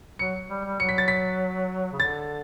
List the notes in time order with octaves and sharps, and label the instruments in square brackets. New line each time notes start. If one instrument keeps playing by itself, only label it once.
[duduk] F#3 [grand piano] C#7
[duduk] G3
G3
[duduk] F#3 [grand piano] C#7
[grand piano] B6
A6
B6
[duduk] C#3
[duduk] D3 [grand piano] A6